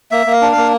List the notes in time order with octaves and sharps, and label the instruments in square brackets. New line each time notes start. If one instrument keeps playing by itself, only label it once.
[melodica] A#3 E5
A#3
F5
D4
A#3 F5